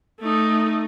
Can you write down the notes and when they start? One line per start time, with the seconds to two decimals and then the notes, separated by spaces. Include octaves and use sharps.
0.20 A3 D#4